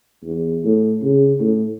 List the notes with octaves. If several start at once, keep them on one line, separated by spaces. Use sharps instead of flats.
E2
A2
C#3
A2